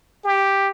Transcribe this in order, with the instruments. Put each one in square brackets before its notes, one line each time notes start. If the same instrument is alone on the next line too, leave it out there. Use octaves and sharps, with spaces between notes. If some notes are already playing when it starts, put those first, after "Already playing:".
[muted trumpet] G4